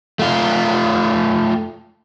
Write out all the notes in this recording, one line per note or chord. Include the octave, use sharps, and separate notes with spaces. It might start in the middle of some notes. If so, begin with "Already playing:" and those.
A3 F4